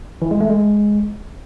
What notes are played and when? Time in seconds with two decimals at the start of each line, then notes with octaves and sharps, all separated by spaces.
0.22 E3
0.31 G#3
0.41 A3
0.50 G#3